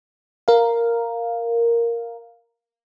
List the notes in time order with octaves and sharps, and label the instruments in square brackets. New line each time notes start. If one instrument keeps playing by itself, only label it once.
[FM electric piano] A#4 F5